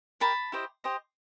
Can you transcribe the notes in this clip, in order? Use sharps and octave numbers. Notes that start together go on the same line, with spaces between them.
G4 A#4 D5 A5 B5
E4 G4 C5 D#5
G4 C5 D#5